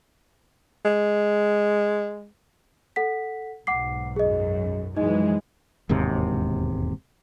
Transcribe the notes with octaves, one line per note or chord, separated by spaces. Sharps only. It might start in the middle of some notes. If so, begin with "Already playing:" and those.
G#3
A4 F#5 B6
B1 G#2 F#5 D6 C7
F#2 G#4 D#5
F#2 E3 F3 G#3 D#4 D#5
E1 D#2 G#2 C3